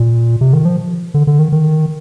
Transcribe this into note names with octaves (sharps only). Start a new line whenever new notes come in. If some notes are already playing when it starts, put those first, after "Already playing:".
Already playing: A#2
C3
D#3
F3
D3
D3
D#3
D#3